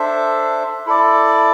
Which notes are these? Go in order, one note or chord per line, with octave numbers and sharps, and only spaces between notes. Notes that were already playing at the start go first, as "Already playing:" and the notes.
Already playing: D4 A4 C5 E5
E4 A4 D5